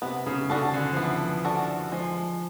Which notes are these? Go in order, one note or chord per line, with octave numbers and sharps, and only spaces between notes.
C3 B3
C#3
C#3 D4 F#4 A4
D3
F3
E3 B3
D4 F#4 A4
F3 G#3